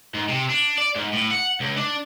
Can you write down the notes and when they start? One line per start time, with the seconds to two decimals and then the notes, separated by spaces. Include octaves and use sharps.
0.14 G#2
0.29 C3
0.49 D4
0.78 D5
0.96 G#2
1.13 A2
1.31 F#5
1.60 C#2
1.77 D4